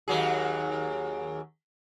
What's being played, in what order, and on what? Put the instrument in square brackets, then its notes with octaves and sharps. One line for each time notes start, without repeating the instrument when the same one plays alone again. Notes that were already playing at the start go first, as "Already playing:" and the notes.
[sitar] D#2 F#3 G#4